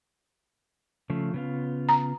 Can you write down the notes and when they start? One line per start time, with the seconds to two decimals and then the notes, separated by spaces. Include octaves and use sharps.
1.10 C#3 F3 A3
1.34 C#3 B3 F4
1.89 A#5